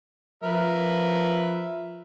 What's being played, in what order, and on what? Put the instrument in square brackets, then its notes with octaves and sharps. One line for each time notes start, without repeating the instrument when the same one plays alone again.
[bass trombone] F3 [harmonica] A#4 B4 E5